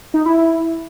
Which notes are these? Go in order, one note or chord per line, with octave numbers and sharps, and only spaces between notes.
D#4
E4
E4